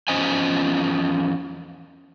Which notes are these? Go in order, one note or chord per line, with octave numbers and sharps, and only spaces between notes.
E2 F3 C#4 C5 D#5 G#5